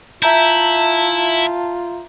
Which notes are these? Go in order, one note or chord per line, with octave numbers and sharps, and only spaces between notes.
E4 F4 E5 A5 A#5 G6